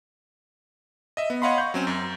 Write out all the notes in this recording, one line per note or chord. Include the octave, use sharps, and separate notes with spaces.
D#5 E5
B3
C#5 D#5 F5 F#5 B5 C6
C#6 G6
F#3 C4 C#4
F#2